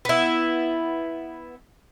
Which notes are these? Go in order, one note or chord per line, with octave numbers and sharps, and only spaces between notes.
B3 E4